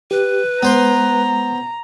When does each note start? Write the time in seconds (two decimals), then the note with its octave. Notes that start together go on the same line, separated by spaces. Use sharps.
0.11 G4 B4
0.63 G#3 B3 C5 A#5 C6